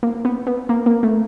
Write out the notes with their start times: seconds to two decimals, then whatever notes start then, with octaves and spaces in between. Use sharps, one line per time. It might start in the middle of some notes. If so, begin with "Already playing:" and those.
0.03 A#3
0.25 B3
0.47 B3
0.69 A#3
0.86 A#3
1.03 A3